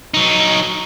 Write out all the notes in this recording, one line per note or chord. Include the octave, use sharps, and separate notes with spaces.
F#3 D#4